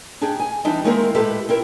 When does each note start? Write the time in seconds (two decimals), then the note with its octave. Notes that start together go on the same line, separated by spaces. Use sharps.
0.21 D4 D#4 G4 G#4
0.40 G#5
0.65 E3 G3 C4 D4 D#4
0.84 D#3 G#3 A#3 C4 E4 A#4
1.15 A2 G#3 G4 A4 B4
1.49 C4 E4 A#4